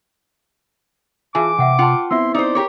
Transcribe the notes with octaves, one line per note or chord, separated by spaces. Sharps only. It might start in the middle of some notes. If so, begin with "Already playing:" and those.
E3 F4 G#4 G#5 A5 D6
C3 E5 F#5 G5
F4 F#5 G5 A5
B3 C4 E4 E5 C6 E6
D#4 C5 D5
G4 A#4 C#5 D6